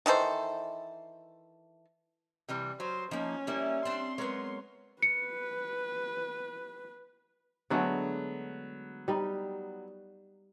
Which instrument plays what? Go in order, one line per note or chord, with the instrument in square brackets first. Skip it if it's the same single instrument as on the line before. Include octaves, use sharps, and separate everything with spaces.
[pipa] D#3 E3 A4 C5
[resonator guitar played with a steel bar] C3 E3 G3
[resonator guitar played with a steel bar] F#3 [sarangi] C5
[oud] F3 A#3 [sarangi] C#4 [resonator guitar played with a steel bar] D#4
[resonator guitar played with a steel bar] G3 [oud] A#3 E4 D#5
[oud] C4 D4 [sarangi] C6
[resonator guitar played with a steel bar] F#3 A#4 C#5 [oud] G#3 B3
[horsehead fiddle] B4 [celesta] C#7
[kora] D3 G#3 A3 [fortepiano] F#3 B3
[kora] G3 D#4